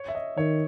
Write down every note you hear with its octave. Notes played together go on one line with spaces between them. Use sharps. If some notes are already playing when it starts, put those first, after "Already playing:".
Already playing: C#5
E5
D#5
D#3 C#5